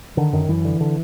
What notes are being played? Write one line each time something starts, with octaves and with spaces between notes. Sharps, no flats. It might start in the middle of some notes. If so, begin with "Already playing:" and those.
D3 D#3
F#2 D#3
F#2 E3
D3
D3